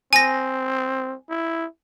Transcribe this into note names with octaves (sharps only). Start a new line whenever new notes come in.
C4 G#5 A#6
E4